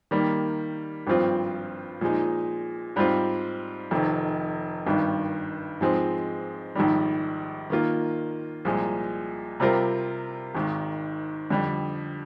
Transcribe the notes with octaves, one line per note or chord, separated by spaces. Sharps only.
D#3 G3 A#3
G#1 G2 F3 C4 F4
A#2 F3 G#3 D#4
G#2 G3 C4 F4
F1 F2 C3 D#3
G#1 G2 D#3
G#2 F3 G#3 C4
A#1 G#2 D#3 G3
D#3 A#3 F4
C2 A#2 F3 G#3
C3 G3 C4 F4 A#4
G#1 G#2 D#3
F2 D3 G3